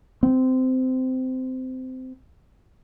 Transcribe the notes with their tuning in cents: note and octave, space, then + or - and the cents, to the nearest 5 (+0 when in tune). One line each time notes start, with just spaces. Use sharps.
C4 -20